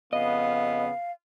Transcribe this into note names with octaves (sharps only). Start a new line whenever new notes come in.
F2 C#3 B3 D#5 F5